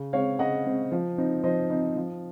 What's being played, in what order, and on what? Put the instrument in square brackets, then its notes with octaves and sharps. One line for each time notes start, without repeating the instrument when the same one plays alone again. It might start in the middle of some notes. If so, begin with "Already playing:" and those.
Already playing: [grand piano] C#3
G#3 C4 C#5 F5
C#3 D#5 F#5
G#3 C4
F3
C4 D#4
F3 C5 D#5
C4 D#4
F3